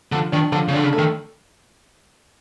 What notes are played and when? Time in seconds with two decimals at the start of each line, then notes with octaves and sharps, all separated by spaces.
0.12 D3 F3
0.32 D#3 D4
0.52 D3 F3
0.68 C#3
0.73 D3 D4
0.83 C#3
0.93 A3
0.98 D#3